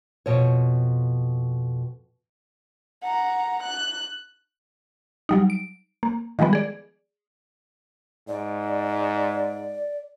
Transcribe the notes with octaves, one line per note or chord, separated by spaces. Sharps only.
F2 B2 C#5
F#5 A#5
F#6
F#3 G3 D#4
D7
A#3
D#3 F3 G3 G#3 B3
G#4 D5
G#2 D5